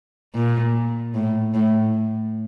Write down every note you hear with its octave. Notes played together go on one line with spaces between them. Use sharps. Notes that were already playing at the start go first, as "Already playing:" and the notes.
A#2
A2
A2